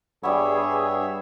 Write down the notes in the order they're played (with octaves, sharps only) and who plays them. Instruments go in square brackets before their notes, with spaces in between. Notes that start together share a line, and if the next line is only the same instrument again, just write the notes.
[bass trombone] G2 [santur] G3 B3 [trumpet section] G#4 [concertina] C#5 E5